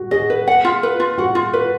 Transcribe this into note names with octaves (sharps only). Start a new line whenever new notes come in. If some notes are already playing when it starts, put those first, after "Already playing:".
Already playing: F#4
G#4 D#5
B4
F#5
F4
B4
F4
F#4 F#5
F4
B4